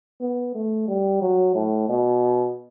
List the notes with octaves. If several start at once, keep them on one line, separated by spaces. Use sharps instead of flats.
B3
A3
G3
F#3
A2
B2